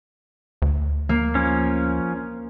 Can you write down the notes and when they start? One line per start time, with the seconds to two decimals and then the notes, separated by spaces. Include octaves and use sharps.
0.62 D2
1.09 A#3
1.35 F3 C#4